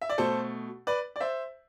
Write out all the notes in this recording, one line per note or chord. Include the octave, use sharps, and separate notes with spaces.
E5
D5
B2 A3 A4 C5
B4 D5
D5
C5 E5